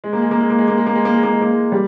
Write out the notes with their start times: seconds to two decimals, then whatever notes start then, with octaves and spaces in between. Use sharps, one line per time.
0.04 G#3
0.13 A#3
0.22 G#3
0.31 A#3
0.41 G#3
0.50 A#3
0.59 G#3
0.68 A#3
0.77 G#3
0.86 A#3
0.96 G#3
1.05 A#3
1.14 G#3
1.23 A#3
1.33 G#3
1.42 A#3
1.52 G#3
1.72 G3